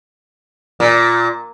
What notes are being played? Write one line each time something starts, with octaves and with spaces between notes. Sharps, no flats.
A#2